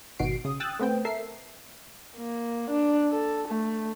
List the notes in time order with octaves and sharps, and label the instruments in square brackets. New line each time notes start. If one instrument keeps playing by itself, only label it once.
[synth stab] G#1 B2 D#3 F#4 C7 D7
C#3 D#6
G5 D#6 E6 F#6 A6
A3 B3 C4 G5
A4 A#4 E5 C7
[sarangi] A#3
D4
A4
A3